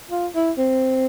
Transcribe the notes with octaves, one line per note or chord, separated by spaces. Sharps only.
F4
E4
C4